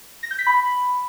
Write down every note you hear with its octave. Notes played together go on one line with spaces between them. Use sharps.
A#6
G6
B6
B5